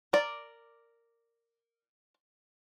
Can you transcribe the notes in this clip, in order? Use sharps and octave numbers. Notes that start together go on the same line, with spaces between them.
A#4 D5